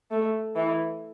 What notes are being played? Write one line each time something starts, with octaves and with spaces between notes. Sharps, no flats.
A3
E3